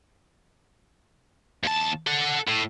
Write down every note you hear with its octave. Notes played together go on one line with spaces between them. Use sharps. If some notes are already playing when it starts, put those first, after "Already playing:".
D#2 A5
A4 F#5
A2